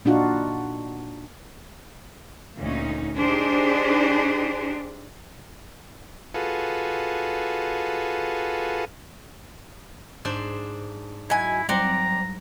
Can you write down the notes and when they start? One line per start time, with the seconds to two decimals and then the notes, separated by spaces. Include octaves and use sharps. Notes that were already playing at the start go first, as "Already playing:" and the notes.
0.05 A#2 D4 D#4 F4 F#4 F#5
2.58 D2 A#2 C#4 D#4
3.18 D4 D#4 G4 G#4 C5
6.34 F4 F#4 G#4 A4 B4
10.25 G#2 D4 C5
11.30 F#3 E4 D#5 G#5
11.69 F#3 G3 C4 D5 F#5 A#5 C6